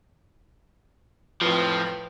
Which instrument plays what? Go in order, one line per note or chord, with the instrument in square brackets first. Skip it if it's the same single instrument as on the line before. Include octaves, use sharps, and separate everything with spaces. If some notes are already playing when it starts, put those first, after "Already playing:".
[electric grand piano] F2 A2 [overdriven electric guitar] F3 [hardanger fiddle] B4 G5